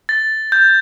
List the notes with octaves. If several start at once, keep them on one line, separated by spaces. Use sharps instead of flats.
A6
G6